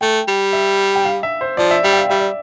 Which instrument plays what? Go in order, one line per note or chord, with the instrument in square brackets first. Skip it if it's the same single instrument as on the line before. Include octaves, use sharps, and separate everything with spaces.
[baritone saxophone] A3 [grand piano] G5
[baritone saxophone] G3
[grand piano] E5
G5
F5
E5
C5
[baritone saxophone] F3 [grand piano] D5
[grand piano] E5
[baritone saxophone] G3 [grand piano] E5
[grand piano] G5
F5
[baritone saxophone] G3 [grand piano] E5
[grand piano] D5